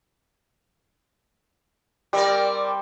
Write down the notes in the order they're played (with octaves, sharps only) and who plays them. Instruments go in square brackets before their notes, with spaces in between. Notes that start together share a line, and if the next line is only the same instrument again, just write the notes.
[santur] G3 [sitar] C4 A#4 D5